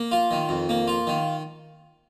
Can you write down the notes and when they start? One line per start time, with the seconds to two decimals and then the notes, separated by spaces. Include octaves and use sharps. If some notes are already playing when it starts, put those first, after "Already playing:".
Already playing: A#3
0.11 F4
0.31 D#3
0.49 F2
0.69 A#3
0.87 F4
1.07 D#3